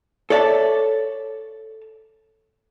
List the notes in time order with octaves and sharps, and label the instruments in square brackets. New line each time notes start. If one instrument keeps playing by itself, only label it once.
[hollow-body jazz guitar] A4 C#5 D5 E5 A5